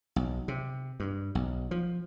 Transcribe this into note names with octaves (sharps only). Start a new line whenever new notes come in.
B1
C3
G2
B1
F3